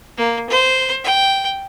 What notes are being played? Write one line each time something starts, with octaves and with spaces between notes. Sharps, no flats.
A#3
C5
G5